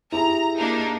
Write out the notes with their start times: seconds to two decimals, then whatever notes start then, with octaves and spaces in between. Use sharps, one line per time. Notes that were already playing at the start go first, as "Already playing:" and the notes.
0.12 E4 G4 G#4 A#5
0.58 A#3 D4 D#4